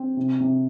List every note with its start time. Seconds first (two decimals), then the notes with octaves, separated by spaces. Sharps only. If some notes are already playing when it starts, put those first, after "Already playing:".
Already playing: C4
0.17 C3
0.40 C3